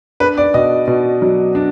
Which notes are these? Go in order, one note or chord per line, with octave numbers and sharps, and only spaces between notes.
D4 B4
D5
B2 D#5
B2
F#3
D4